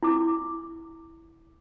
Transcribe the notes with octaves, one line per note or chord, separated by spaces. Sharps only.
E4 D6